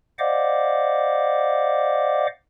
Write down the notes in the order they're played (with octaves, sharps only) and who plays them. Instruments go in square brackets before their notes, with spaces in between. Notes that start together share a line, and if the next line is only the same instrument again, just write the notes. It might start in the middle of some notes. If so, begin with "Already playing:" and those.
[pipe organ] C5 D5 D#5 F5 F#5 D6